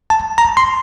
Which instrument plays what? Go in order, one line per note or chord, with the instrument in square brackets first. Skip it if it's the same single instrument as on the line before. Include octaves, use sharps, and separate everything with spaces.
[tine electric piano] A5
A#5
C6